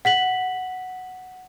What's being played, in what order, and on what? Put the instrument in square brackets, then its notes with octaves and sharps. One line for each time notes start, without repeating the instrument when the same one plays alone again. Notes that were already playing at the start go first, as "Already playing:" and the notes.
[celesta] F#5 B6 F#7